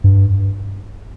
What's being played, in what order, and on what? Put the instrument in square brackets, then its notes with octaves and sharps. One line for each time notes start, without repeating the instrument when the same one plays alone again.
[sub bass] G2